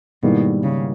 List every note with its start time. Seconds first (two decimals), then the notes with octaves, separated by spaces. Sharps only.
0.23 G#2 B2 D#3 G3 A#3 E4
0.63 C#3